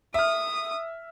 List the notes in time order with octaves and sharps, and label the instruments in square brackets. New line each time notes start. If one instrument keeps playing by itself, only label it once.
[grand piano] E5 F6 [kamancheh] D#6